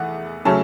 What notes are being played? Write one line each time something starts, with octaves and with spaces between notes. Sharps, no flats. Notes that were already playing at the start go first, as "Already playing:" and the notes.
Already playing: E2 A3 F#5
C#3 F#3 A3 C#4 A5